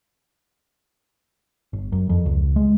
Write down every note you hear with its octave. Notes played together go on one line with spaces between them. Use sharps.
G1
F#2
F2
C#2
G#3